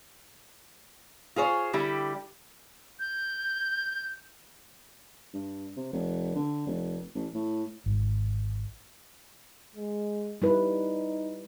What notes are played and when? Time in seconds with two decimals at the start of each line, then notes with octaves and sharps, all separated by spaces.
1.36 F4 G#4 C5 C#5
1.73 D3 G3 E4 G4
3.00 G6
5.34 G2
5.77 C3
5.93 F1
6.35 D3
6.66 F1
7.15 A1
7.34 A2
7.86 G#1
9.76 G#3
10.42 G3 D#4 E4 B4